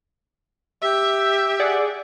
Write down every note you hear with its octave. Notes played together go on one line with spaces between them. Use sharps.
G4 E5
G#4 D5 F#5